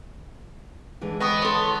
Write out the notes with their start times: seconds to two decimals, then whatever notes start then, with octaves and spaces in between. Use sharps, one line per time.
1.01 D3 E3 G#3
1.20 B3 D#5 G5 C#6 D#6
1.42 A4 C#5 C6